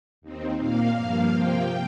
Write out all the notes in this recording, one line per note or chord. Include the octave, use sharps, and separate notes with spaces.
D#2 D#3 C4
A#2 A#3 F5
G2 F3 A#3
C3 F3 A#3 G5